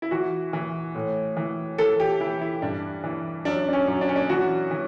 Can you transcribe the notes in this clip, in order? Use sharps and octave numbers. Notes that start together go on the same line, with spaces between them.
E4
E3 F#4
E3
A2
E3
E3 A4
G4
E3 E4
E4
G2 D4
E3
F#2 D4
D4
C#4
F#2
D4
C#4
D4
E3 F#4
E3